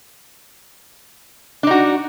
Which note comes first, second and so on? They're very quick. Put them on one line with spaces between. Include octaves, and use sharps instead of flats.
D4 D#4 F#4